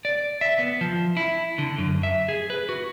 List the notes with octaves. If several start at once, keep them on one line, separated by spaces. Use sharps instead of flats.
D5
E5
B3
F3
E4
D3
F#2
E5
G#4
B4
F#4